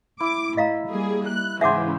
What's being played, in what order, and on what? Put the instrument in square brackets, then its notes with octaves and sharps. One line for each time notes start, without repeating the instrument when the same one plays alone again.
[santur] E4 [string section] D6
[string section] A2 [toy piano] D#5 F5 A#5
[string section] G3 A#3 G#4
F#6
[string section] G#2 C#3 E3 [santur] C5 G#5 [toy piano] E5 F#5 D6